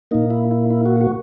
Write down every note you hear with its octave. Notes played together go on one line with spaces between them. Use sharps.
A#2 A#3 D#4
E4
E4
E4
F#4
F#4